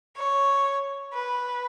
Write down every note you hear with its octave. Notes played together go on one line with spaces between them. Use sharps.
C#5
B4